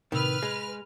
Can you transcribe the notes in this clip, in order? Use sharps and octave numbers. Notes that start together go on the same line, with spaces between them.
A2 C3 D#3 B4 E6 F6
G#3 G#4